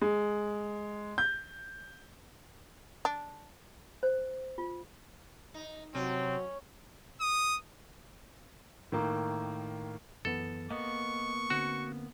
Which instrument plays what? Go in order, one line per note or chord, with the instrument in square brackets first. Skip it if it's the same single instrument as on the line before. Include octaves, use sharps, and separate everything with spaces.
[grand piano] G#3
G6
[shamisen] D4
[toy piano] C5
F4
[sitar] D#4
[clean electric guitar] C3 [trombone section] F#3 [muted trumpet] C4 [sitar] C#4
[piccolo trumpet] D#6
[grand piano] A2 D#3 A#3
[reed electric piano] F#2 E3 B3 [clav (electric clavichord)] A4
[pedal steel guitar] A#3 B3 [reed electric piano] D#5 [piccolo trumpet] C#6
[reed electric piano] D3 C4 [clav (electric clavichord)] F#4